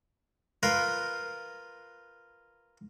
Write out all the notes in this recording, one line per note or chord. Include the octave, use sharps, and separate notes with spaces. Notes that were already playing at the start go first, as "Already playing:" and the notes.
F4 A#4 B4